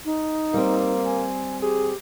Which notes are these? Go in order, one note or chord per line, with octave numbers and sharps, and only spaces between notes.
D#4
G3 A#3 C4
G#5
G4 G#4